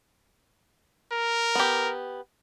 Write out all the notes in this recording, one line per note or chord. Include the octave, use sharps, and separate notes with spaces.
A#4
B3 G4